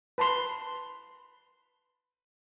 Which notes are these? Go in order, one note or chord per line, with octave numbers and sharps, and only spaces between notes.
B4 A5 B5 C6